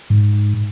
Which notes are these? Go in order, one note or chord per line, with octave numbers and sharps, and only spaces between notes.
G#2